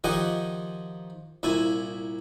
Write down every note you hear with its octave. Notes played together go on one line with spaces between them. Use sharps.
D#3 F3 G4 D#5 F#5 G#5
C2 A#2 E4 G#5